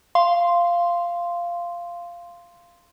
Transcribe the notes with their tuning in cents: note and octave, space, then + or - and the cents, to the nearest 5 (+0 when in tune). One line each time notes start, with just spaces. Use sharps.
F5 -10 C6 +0